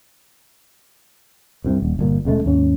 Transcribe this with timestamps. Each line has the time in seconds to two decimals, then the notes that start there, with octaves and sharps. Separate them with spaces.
1.64 C2 G2 C3
1.82 D#1
1.99 G1 A#2
2.25 E1 C#3 G#3 A3
2.45 D#2 G#2 C#4